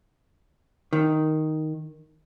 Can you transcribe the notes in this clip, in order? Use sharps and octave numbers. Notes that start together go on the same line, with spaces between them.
D#3